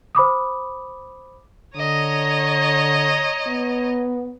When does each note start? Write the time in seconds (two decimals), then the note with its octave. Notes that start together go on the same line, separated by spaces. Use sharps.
0.15 C5 B5 D6 D#6
1.76 D3 C#5 D#5 A#5
3.47 B3